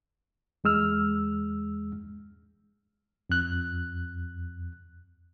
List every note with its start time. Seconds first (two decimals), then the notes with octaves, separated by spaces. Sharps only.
0.64 E2 G#3 E6 F6
3.30 F2 F#6